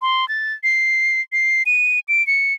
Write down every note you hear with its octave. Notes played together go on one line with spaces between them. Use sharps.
C6
A6
C7
C7
D#7
D7
C#7